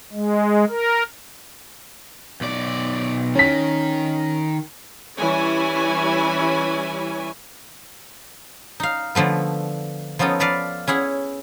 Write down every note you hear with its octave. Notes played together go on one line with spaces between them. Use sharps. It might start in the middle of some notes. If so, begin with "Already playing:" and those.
G#3
A#4
B1 D5
D#3 C#4 B6
E3 G3 C#4 E4 C#5 G#5
D#4 F5
D3 F3 A3 B3
F3 B3 C#4 D#4 A4
A4 B4 D5 F5
C#4 E4 G#4 F#5